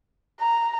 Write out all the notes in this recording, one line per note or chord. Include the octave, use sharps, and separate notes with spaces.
A#5